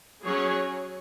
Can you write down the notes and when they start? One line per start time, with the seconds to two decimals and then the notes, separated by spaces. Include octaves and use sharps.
0.24 F#3 C#4 G#4 C#5